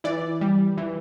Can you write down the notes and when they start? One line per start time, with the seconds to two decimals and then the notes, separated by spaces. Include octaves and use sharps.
0.04 E3 D5
0.41 G3
0.78 E3